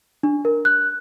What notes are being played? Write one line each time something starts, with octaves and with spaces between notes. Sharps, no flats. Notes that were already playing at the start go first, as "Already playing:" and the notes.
D4
A#4
F#6